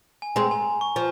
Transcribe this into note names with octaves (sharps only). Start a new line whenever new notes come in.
G#5
G#3 C4 A#5
G#5
C#6
F3